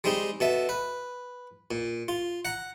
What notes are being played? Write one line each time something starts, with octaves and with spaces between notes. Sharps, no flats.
G3 G#3 C4 D#4
B2 A4 E5
B4
A#2
F4
F#5 A#5